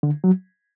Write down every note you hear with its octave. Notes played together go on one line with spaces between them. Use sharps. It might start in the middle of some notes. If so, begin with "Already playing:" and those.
D3
F#3